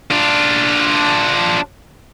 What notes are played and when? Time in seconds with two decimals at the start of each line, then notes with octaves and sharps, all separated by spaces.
0.11 D4 F4